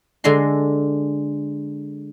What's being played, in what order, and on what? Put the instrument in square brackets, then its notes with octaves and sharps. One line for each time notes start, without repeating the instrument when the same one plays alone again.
[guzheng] D3 G#3 A4 A#5 C6